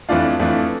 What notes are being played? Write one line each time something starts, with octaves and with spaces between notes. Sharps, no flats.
F2 E3 A3 D4 F4
F2 E3 A3 D4 F4